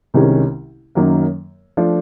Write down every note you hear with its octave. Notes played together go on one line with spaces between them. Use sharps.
C2 C3 D#3 G#3 C#4
F#2 D#3 F#3 A#3
F3 A3 D4 F4